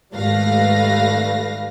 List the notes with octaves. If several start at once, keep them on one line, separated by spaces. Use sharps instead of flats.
G#1 G3 A3 B4 F5 A#6